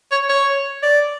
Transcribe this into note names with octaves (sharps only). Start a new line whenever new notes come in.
C#5
C#5
D5